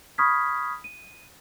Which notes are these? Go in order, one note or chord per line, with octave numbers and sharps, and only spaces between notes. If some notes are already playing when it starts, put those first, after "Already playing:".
B5 C#6 D#6 F6 G#6 B6
D#7